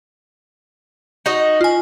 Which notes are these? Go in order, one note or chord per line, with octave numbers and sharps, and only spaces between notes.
D#4 F#4 D#5
F4 G#5